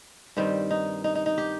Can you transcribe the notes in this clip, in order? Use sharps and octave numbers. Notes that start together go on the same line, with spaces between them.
G2 D#3 G3 C4
D#4
D#4
D#4
D#4
G4